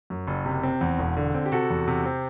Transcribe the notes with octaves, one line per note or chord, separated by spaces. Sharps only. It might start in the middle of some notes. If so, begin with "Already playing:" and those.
F#2
F#1
C3
C4
E2
E1
D3
C4
G4
C3 F#4 A4
E2
C3
C4